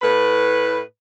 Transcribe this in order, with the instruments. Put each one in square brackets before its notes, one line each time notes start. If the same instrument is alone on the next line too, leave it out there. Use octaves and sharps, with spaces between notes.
[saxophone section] A2 B4